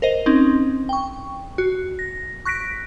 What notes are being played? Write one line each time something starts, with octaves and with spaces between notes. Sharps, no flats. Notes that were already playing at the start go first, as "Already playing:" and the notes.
A#4 C5 D#5
C4 C#4 D#4
G5 C#6
F#4
A#6
C#6 F#6 A#6 B6 D7